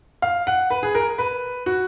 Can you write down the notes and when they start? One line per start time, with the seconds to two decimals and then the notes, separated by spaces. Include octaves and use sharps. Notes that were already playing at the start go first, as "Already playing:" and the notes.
0.22 F5
0.47 F#5
0.70 B4
0.83 G#4
0.95 A#4
1.18 B4
1.66 F#4